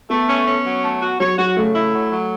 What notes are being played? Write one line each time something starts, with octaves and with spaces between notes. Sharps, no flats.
A3 B3
C#4
C#4
F#3
A3
F#4
F#3 C#5
F#3 F#4
C#3 A3
E4
F#3
F#3